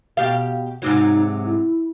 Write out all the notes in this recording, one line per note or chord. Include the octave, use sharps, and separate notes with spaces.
B2 G4 F5
G#2 C3 F#3 D#4
E4